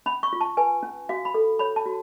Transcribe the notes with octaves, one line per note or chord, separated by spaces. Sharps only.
C#4 B5
C#6
F4
A5
B4 G#5
C#4
F#4 F5
B5
A4
C#5 B5
A5
F#4